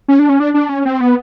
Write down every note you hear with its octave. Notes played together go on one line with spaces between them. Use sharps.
C#4
D4
C#4
D4
D4
C#4
C4
B3